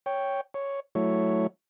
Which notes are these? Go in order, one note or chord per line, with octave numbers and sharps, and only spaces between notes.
C#5 G5
C#5
F#3 A3 E4 C#5